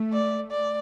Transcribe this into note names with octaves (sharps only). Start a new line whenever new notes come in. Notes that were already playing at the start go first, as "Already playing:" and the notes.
Already playing: A3
D5
D5